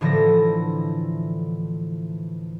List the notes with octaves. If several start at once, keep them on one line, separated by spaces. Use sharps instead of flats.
A2 D3 E3 F3 A4 A#6